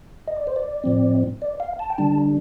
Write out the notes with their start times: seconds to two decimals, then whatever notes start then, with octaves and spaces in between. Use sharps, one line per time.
0.28 D#5
0.37 D5
0.47 C5
0.56 D5
0.84 A2 F3 C4
1.42 D5
1.60 F5
1.79 A5
1.90 G5
1.98 D3 G3 D4 A5